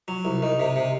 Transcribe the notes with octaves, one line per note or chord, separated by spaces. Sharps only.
F#3
C2
D#3
C3
C3